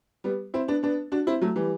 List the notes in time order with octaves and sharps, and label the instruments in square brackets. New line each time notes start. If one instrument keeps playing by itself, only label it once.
[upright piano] G3 B3
C4 E4
B3 D4
B3 D4
D4 F#4
C4 E4
F#3 A3
E3 G3